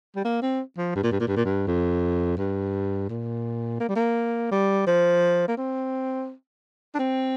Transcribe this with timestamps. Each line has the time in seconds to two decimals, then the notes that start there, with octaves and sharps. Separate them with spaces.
0.16 G3
0.25 A#3
0.42 C4
0.78 F3
0.95 G2
1.03 A#2
1.12 G2
1.20 A#2
1.28 G2
1.36 A#2
1.45 G2
1.67 F2
2.38 G2
3.09 A#2
3.80 A#3
3.89 G3
3.96 A#3
4.51 G3
4.87 F3
5.48 A#3
5.57 C4
6.94 D4
6.99 C4